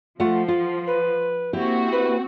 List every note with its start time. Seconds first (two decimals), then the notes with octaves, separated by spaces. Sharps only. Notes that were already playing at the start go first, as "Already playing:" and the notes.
0.20 F3 A3 F4 F#5
0.48 F4
0.87 B4
1.53 A#3 C4 E4 F#4 G4
1.92 B4